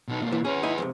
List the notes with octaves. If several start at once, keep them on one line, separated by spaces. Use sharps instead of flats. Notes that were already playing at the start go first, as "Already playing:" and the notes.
B2 D#4
B2 A#3
E3
C#4 G#4 B4
G#3 D#4 E4
F2 G#2 C3